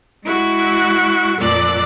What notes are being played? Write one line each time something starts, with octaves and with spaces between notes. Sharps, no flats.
G#3 E4 F#4
F2 A#2 F3 D5 E6 F#6